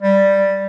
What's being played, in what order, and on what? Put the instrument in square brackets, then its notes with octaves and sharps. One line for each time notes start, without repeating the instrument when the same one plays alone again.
[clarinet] G3